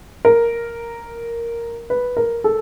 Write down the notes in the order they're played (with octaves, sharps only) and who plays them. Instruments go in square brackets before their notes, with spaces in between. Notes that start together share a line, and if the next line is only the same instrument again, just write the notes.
[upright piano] A#4
B4
A#4
A4